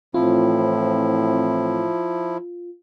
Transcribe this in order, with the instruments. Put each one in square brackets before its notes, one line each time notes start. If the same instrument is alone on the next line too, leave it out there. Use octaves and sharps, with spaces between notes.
[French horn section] A2 E3 C4 [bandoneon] F3 E4 [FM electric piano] F4